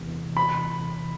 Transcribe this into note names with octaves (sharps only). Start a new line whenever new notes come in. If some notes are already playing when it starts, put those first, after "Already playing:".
Already playing: E2 C3 E3
B5